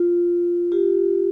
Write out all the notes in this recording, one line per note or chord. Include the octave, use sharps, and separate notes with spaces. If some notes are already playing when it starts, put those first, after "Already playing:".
Already playing: F4
F4 G4